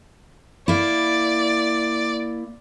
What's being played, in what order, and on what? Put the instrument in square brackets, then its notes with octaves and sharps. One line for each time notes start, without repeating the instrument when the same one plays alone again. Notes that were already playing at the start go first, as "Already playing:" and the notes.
[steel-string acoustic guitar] A#3 E4 [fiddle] D5